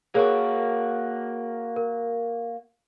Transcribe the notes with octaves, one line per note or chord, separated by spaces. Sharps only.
A#3 F#4 G#4 A#4 C#5
A#4